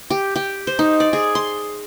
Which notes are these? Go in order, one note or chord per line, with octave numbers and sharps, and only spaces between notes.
G4
G4
C5
D#4
D5
G#4
C6